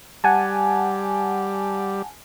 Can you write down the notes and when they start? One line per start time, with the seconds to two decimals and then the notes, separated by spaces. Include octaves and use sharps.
0.24 G3 F#5 G#5 A5